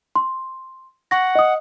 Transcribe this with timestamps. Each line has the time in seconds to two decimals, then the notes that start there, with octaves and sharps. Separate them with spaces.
0.16 C6
1.11 F#5 C#6 A#6
1.35 D#5 D#6